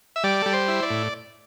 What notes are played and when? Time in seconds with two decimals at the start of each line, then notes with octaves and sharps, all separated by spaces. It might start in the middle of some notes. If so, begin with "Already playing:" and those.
0.16 E5
0.24 G3 D5
0.42 G3 A4
0.53 C5
0.68 E4
0.82 D5
0.90 A2